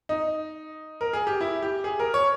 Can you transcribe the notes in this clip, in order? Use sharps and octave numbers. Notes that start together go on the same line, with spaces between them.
D#4
A#4
G#4
G4
E4
G4
G#4
A#4
C#5